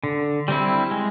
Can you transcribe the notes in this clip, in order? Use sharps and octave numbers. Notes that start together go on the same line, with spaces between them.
D3
G3 C4 E4
G#3